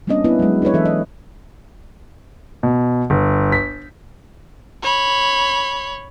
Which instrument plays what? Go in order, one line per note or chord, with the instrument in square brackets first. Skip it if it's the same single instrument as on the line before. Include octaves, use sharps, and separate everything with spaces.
[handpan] G3 A#3 B3 C#4 D4 D#5
B3 E4 B4
F#3 G#3
D4 E4 B4 C#5
E3 A4 E5
D#5
[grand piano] B2
G1
B6
[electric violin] C#5 B5